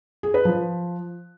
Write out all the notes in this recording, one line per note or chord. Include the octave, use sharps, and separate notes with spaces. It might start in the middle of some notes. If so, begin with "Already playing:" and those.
G#4
B4
F3